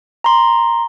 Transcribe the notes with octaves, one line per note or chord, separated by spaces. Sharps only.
A#5 C6